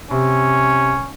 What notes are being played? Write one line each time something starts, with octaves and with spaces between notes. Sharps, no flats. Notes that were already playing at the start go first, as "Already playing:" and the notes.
C3 C#4